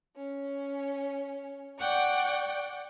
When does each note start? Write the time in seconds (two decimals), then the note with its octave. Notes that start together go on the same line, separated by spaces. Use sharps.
0.16 C#4
1.78 D5 F#5 G5 C#6